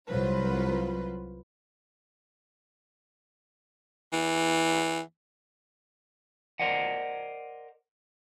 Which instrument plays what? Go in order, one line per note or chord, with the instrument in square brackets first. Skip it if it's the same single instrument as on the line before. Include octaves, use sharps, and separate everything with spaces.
[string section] C2 F#3 F4 B4 C5
[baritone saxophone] E3
[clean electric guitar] A#4 C5 D5 D#5 F#5